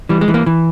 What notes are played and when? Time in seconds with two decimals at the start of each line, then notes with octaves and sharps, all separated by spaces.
0.09 E3 G3
0.21 G#3
0.28 E3
0.34 A#3
0.46 E3